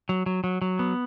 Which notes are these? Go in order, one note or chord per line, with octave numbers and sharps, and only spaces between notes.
F#3
F#3
F#3
F#3
B3